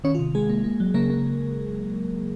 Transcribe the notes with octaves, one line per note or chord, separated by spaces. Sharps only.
D#3 C#4 C#5
F4
C3
C3 G#3 G#4
A#3
A#3
F#3
C#3 A#3 A#4
A#3